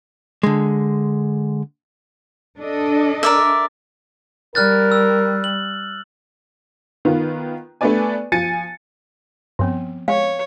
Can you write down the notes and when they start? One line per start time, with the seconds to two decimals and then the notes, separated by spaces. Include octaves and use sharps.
0.43 D3 G#3
2.59 D4 A4 D#5
3.23 A#4 D5 E5
4.55 G3 A#4 F6 F#6 A6
4.92 E6
5.44 F#7
7.05 D#3 B3 F4
7.81 A3 B3 D4 B4 D5 G#5
8.32 F3 G#5 A6 C#7 D#7
9.59 G2 F3 B3 C4
10.08 G#3 C#5 F5